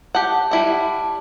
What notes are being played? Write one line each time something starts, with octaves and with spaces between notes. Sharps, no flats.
G4 F#5 A5
G3 E4 F#5